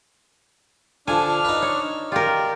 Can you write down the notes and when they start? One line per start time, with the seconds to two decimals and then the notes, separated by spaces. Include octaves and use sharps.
1.08 D3 F3 D4 G#5 F6
1.45 D#4 B4
1.62 C#5
2.12 F4 G4 A#4 D5